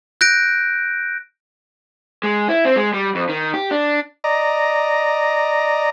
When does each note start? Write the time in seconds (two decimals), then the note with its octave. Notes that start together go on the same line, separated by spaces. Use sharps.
0.21 F#6 G6 A#6 D7
2.24 G#3
2.49 E4
2.65 C4
2.76 G#3
2.94 G3
3.15 F2
3.29 D#3
3.54 G4
3.71 D4
4.24 D5 D#5 A#5